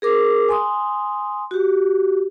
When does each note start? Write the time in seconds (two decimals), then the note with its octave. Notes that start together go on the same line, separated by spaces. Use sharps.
0.02 G#4 A#4 D6
0.49 G#5 C6 D#6
1.51 F#4 G4